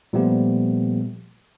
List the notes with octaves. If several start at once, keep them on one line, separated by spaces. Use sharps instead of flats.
A#2 F3 G3 A3 B3 G4